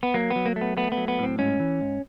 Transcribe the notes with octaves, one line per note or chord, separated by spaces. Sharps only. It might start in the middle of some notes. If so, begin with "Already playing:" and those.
B3
F#3 A#3
B3
F#3
A#3
A3
B3
A3 B3
B3
F#3
B3
A2 C4
G#2 C#4
E3
G#2